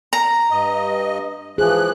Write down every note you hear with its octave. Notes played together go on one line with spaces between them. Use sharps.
A#5
G2 D#5
E3 F3 G#4 F#6